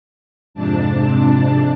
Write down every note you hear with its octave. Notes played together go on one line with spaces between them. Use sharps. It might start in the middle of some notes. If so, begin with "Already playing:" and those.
F2 G#2 C3 D4 A5